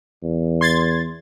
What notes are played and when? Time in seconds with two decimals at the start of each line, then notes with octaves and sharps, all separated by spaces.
0.23 E2
0.61 C6 G#6 A6